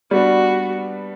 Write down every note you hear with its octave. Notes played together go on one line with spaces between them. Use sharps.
G3 B3 D4 F#4